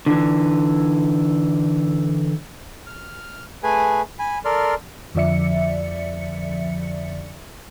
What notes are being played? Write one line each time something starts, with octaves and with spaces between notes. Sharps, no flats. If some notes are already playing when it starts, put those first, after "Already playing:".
D3 E3
F6
A3 G#4 B4 G#5
G#5 B5
A4 A#4 D5 C6 F6
F2 D3 F3 D5 E5 C#7